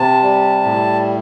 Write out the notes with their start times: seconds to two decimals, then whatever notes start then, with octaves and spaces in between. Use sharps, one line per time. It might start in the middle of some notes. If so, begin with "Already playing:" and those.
Already playing: C3 A5
0.23 G3
0.64 A2